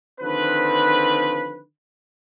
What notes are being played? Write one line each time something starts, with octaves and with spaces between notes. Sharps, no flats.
D3 D#3 F3 C4 B4